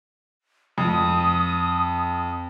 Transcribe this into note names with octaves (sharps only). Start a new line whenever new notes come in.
F2 D#6